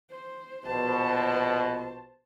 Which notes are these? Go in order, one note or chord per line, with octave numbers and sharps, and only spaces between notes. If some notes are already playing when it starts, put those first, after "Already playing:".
C5
A#1 B2 C5 A5